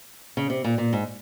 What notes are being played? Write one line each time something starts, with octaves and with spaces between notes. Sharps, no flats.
C#3
C3
A#2
A#2
G#2